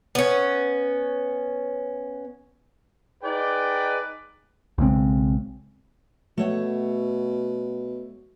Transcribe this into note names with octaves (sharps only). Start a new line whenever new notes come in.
B3 C#4
D#4 G#4 B4 D5 G5
B1 C#3 G#3 C4
B2 A3 C#5 F#5